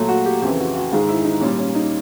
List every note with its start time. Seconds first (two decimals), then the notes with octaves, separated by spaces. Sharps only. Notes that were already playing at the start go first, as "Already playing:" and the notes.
Already playing: A#2 F#3 A3
0.09 F#4
0.26 G4
0.42 F2 C#3 E3 G4
0.59 F#4
0.75 F#4
0.92 G#2 D#3 G#3 F4
1.08 E4
1.25 D#4
1.41 A#2 G3 C#4
1.59 C#4
1.75 D#4